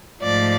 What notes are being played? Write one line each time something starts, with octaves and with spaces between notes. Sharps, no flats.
G#2 F3 A3 D5